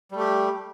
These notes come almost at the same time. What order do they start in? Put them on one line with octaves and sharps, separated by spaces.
G3 A3 G4